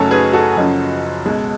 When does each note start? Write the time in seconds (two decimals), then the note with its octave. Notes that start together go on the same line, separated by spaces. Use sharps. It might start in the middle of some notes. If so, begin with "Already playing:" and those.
Already playing: F#1 F#2 C#3 F#3 A3 A4 C#5
0.11 G#4 B4
0.33 F#4 A4
0.57 F#1 F#2 C#3 F3
1.26 C#2 B2 G#3